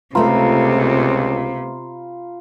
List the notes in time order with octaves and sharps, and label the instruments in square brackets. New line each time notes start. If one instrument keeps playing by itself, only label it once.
[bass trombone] C#2 [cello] C3 [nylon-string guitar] A3 B3 [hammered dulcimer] F4 A#5 B5